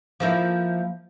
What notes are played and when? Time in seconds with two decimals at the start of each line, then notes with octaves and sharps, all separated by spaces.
0.20 F3 A#3 E4